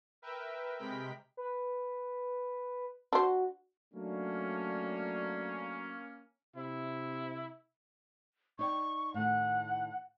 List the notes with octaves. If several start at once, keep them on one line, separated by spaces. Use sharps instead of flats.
A#4 B4 E5 G5
C3 G#3 A#4 G5 B5 B6
B4
D4 F#4 C5
F#3 A3 A#3 C#4 D4
C3 E4
D#4 D5 G5 C#6
A2 D#3 F#5